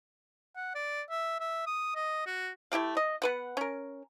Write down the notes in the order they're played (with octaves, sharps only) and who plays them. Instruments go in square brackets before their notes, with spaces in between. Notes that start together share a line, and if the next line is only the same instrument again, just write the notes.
[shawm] F#5
D5
E5
E5
D#6
D#5
F#4
[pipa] A3 E4 G4 F5
D#5
B3 B4 F#5
C#4 A#4